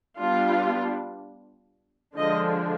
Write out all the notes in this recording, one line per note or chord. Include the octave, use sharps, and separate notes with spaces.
G3 B3 D4 F4
D3 F3 G#3 D4 D#5